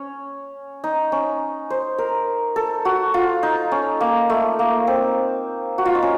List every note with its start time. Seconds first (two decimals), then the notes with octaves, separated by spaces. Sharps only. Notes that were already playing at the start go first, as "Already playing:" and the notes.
Already playing: C#4
0.84 D#4
1.12 C#4
1.70 C5
1.98 A#4
2.56 A4
2.85 F#4
3.14 F4
3.43 D#4
3.72 C#4
4.01 A#3
4.30 A3
4.59 A#3
4.87 C4
5.78 F#4
5.86 F4
5.95 D#4
6.03 C#4